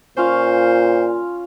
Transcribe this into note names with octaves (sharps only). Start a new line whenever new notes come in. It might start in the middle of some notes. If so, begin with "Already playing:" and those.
A#2 C#4 F4 C5 F5